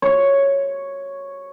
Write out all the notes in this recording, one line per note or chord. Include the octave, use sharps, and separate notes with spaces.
C#5